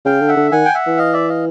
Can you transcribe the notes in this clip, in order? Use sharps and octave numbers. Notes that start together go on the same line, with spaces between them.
C#3 F5 G5
D3
E5 F#5
D3
D#3 F#5 G#5
G5
E5 F#5
E3
D#5 F5
D5 E5
D#5 F5